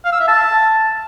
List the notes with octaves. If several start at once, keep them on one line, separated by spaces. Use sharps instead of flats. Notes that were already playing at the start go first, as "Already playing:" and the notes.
F5
E6
E5
A5